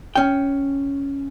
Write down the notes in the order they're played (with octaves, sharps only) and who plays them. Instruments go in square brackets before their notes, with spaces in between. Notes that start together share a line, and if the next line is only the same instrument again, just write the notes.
[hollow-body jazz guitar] C#4 G5